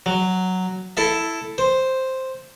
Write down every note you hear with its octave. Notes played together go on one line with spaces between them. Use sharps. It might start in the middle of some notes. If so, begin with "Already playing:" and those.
F#3
E4 A4 E5
C5